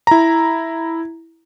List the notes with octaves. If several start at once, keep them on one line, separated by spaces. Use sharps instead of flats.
E4 A#5